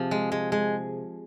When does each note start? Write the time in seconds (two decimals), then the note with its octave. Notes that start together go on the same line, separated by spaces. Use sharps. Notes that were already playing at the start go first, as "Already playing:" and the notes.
Already playing: C3 F3 G#4
0.11 G#3
0.32 G#3
0.52 G#3